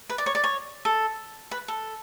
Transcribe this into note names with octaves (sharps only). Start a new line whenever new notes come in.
B4
D5
C#5
D5
C#5
A4
B4
A4